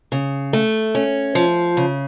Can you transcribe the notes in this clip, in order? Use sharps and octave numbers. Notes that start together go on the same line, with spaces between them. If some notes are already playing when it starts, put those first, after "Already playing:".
C#3
A3
C#4
F3
C#3